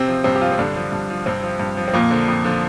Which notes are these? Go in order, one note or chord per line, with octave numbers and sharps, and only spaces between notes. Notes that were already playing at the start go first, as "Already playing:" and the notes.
Already playing: C3 C4
F3
G2 C3 C4
G4
F3 F4
C4
G2 D3 D4
F3
G2
F3
G2 C3 C4
F3
G2
F3
C4
F2 A#2 A#3
D3 F3
F2
D3 F3